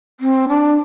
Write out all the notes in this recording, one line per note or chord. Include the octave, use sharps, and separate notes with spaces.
C4
D4